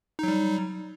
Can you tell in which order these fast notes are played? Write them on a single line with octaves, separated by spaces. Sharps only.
D#4 F#3 G3